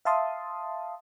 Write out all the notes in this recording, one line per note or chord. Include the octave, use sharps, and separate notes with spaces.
E5 F5 A5 C6 D#6